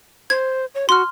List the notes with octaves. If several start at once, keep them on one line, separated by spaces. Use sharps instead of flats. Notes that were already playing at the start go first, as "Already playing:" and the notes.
C5 G#6
C#5
F#4 C6 F6